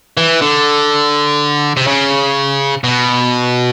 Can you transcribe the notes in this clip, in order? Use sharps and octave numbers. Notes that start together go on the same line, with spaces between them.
E3
D3
C3
C#3
B2